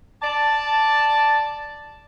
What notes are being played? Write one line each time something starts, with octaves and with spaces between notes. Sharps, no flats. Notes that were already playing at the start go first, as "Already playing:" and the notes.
D5 A5